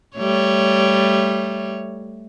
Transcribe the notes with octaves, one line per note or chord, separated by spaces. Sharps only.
G3 A3 C#5